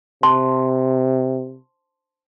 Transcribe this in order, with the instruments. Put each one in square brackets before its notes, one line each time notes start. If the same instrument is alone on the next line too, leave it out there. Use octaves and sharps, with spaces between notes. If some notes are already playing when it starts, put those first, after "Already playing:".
[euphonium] C3 [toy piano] C5 A5 C6